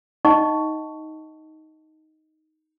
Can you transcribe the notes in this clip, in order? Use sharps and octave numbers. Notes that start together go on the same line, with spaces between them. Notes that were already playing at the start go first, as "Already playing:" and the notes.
D#4 D#5 F#5 A5 C#6